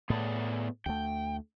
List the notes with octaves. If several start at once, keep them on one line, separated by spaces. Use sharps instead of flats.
A2 B3 G#4 D5
D2 A3 G5